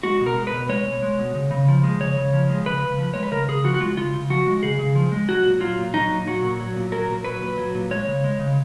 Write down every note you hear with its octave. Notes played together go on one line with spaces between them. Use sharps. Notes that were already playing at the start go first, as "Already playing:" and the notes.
G#3 F#4
B2
A#4
G#3
B4
B2
G#3 C#5
B2
G#3
B2
C#3
C#3
F3
G#3
C#3 C#5
C#3
F3
G#3
C#3 B4
C#3
F3
G#3 C#5
B4
C#3 A#4
C#3 G#4
F3 F#4
F#4
G#3 F4
C#3 F4
C#3
F3 F#4
G#3
C#3 G#4
C#3
F3
G#3
F#3 F#4
A#2
F#3 F4
A#2
F#3 D#4
A#2
F#3 F#4
A#2
F#3
A#2
F#3 A#4
A#2
F#3 B4
A#2
F#3
A#2
G#3 C#5
C#3
G#3
C#3